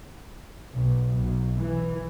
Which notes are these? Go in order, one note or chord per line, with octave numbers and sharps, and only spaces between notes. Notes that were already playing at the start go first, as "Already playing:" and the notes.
B1
B1
E3